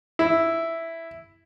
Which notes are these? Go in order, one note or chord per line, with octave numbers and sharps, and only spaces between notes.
E4